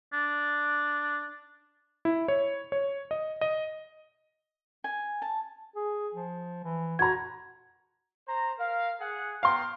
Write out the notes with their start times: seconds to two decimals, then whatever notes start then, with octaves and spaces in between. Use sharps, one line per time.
0.13 D4
2.05 E4
2.28 C#5
2.72 C#5
3.11 D#5
3.41 D#5
4.84 G#5
5.22 A5
5.76 G#4
6.15 F3
6.64 E3
6.99 F#4 A#5 G#6
8.27 C5 A#5
8.59 A#4 F5
9.00 G#4 F#5
9.43 B3 F5 G5 A#5 C6